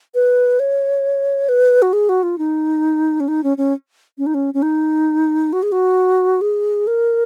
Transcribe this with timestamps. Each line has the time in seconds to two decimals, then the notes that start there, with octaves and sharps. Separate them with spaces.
0.14 B4
0.59 C#5
1.49 B4
1.82 F#4
1.93 G#4
2.09 F#4
2.23 F4
2.38 D#4
3.20 C#4
3.28 D#4
3.44 C#4
3.58 C#4
4.18 C#4
4.26 D#4
4.34 C#4
4.54 C#4
4.62 D#4
5.53 F#4
5.63 G#4
5.72 F#4
6.41 G#4
6.87 A#4